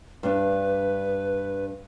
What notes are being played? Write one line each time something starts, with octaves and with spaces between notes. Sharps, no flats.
G2 D4 B4